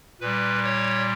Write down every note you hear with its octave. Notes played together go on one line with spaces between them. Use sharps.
A#2 G3 B4
C#5